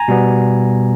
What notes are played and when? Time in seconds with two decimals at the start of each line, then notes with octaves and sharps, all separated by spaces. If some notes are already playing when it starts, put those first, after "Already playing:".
Already playing: G#5 A#5
0.08 B2 G3 B3